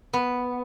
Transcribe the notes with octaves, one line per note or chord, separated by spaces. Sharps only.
B3